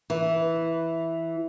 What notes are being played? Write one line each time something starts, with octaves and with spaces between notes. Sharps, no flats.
E3